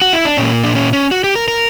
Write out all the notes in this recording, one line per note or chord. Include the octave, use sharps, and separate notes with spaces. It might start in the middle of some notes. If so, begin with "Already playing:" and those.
F#4
E4
D4
A#2 A#3 C#4
D4
C#4
C#4
F#4
G4
A#4
A#4